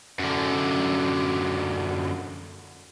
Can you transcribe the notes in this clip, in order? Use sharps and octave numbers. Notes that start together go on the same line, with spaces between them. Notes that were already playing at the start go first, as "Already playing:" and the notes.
F#2 D3